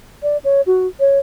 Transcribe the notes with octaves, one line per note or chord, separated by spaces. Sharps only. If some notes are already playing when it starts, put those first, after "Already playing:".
D5
C#5
F#4
C#5